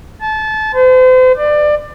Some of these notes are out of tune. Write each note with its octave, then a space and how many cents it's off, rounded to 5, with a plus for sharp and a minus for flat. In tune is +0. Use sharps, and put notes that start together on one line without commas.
A5 -25
C5 -40
D5 +25